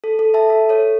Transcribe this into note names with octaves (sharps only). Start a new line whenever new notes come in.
A4
A4
E5 A5
A4
A4 C#5